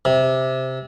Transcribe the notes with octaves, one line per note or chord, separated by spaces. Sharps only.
C3